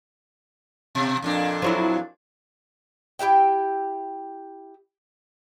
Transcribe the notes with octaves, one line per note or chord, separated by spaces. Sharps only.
B2
F2 A#2 D4
F3 F#3 E4
E4 G4 E5 G5